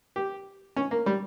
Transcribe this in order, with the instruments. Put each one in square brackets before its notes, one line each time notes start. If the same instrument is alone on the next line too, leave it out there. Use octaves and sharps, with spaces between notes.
[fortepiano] G4
C#4
A#3
G3